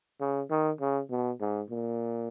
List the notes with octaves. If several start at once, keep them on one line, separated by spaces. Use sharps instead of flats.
C#3
D#3
C#3
B2
G#2
A#2